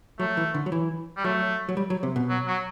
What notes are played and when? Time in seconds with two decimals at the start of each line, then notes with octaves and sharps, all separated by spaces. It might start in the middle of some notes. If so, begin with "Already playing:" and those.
0.19 F#3 A3
0.37 E3
0.54 D3
0.66 F#3
0.72 E3
1.17 G3
1.24 F#3 A3
1.69 F#3
1.77 G3
1.90 F#3
2.03 C3
2.16 B2
2.29 F#3
2.47 F#3